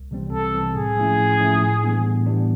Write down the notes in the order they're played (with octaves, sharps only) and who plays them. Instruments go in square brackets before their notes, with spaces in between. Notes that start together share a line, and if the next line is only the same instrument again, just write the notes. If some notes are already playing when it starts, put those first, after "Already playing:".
Already playing: [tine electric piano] C2
C3 E3 G3 C4
[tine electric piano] C2 [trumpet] A4
[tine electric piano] C3 E3 G3 C4
[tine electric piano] A2 [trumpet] G#4
[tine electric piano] F3 A3 C#4 E4
A2
F3 A3 C#4 E4
A2
E3 G3 B3 D4
A2
E3 G3 B3 D4